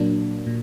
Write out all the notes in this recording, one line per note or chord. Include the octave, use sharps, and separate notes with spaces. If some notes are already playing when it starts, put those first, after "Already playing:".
Already playing: A#2 F#3 A#3 D4
A#2